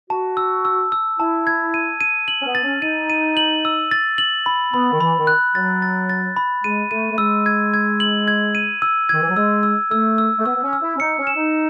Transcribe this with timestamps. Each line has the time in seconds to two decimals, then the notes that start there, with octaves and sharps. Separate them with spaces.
0.10 F#4 A5
0.37 E6
0.65 E6
0.92 E6
1.19 E4 A5
1.47 G#6
1.74 D#7
2.01 D#7
2.28 F#7
2.41 C#4
2.46 B3
2.55 A6
2.64 C#4
2.82 D#4 D#7
3.10 D#7
3.37 F#7
3.65 E6
3.91 A6
4.18 F#7
4.46 B5
4.73 B3 B5
4.93 D#3
5.00 E3 B5
5.19 D#3
5.27 F#6
5.55 F#3 A6
5.82 A6
6.10 A6
6.36 B5
6.64 G#3 D#7
6.91 A3 D#7
7.11 A3
7.18 G#3 E6
7.46 G#6
7.74 G#6
8.00 F#7
8.28 G#6
8.55 D#7
8.82 E6
9.09 D#3 G#6
9.21 E3
9.29 F#3
9.36 G#3 E6
9.63 E6
9.91 A3 E6
10.18 E6
10.39 A3
10.45 B3 E6
10.56 B3
10.64 C#4
10.73 E6
10.82 E4
10.96 C#4
11.00 D#4 C#7
11.18 C#4
11.27 E7
11.36 D#4